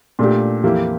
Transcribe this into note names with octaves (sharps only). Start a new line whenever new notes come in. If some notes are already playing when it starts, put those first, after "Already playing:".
A#2 A3 D4 G4
F2 E3 A#3 E4 G4